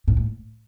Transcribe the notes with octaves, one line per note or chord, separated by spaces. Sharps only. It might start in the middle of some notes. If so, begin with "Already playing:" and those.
G#2
A2